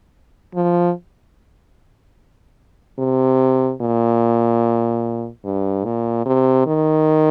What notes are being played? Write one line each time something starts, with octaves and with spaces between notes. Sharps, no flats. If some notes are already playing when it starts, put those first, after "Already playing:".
F3
C3
A#2
G2
A#2
C3
D#3